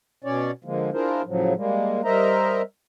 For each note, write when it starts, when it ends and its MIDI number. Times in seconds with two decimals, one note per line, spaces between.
0.24 0.51 47
0.24 0.51 61
0.24 0.51 73
0.24 0.51 74
0.64 0.90 50
0.64 0.90 53
0.64 0.90 56
0.64 0.90 58
0.93 1.22 62
0.93 1.22 64
0.93 1.22 65
0.93 1.22 68
0.93 1.22 70
0.93 1.22 72
1.26 1.54 45
1.26 1.54 49
1.26 1.54 53
1.26 1.54 54
1.56 2.01 55
1.56 2.01 56
1.56 2.01 58
2.04 2.62 55
2.04 2.62 70
2.04 2.62 72
2.04 2.62 75
2.04 2.62 76
2.04 2.62 82